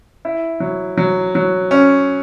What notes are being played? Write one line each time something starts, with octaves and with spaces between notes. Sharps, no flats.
E4
F#3
F#3
F#3
C#4